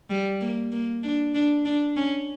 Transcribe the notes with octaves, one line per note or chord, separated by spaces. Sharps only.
G3
A#3
A#3
D4
D4
D4
C#4